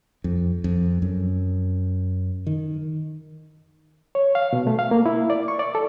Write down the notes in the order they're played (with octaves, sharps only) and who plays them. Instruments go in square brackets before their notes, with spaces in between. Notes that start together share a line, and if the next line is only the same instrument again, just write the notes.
[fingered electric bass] F2
F2
F#2
D#3
[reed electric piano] C#5
F5
B2
A3
F5
A#3
E4
D5
C#6
D5
A4